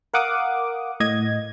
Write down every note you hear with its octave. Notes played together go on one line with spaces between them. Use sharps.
A#4 F5 F#5 D6 D#6
A2 D#5 G#6